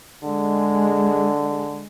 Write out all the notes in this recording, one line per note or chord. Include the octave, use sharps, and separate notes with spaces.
D3 G#3